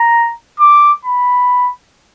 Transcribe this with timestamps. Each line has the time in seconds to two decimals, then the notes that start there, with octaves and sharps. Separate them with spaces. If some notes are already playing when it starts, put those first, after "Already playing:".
Already playing: A#5
0.60 D6
1.05 B5